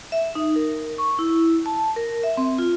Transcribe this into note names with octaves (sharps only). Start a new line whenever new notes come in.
E5
D#4
A#4
C#6
E4
A5
A#4
E5
C4
F4